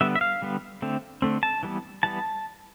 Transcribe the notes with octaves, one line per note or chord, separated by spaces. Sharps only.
D3 G3 B3 E5
E5
F5
D3 G3 B3
D3 A3 C4
D3 A3 C4
A5
E3 G3 B3
E3 G3 B3 A5